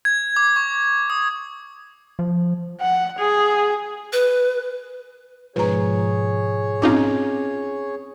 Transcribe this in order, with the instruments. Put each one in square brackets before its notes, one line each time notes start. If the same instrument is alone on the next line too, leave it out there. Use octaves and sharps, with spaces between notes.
[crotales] G#6
D6
C#6
D#6
[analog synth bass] F3
[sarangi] F#5
G#4
[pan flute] B4
[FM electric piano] G#2 B2 F3 [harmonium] G#4 C#5 [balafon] B4 A#5
[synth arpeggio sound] A#1 D#4 F4 [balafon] C4 C#4 D6